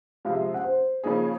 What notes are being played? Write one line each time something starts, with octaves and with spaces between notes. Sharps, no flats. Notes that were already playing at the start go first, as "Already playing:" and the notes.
C3 F3 G#3 F5
E5
F#5
C5
C#3 F3 A#3 D#4 G#4